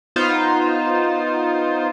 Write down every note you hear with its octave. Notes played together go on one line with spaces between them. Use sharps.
B3 D#4 F4 C5